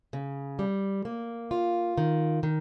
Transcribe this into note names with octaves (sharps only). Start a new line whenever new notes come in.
C#3
G3
A#3
F4
D#3
D#3